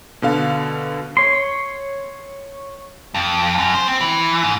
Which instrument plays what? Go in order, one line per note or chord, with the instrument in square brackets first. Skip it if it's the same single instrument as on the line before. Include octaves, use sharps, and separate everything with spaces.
[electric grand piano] B2 D3 F5
[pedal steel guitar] C#5 C6
[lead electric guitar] F2
F#2
C5
C4
E3
G#2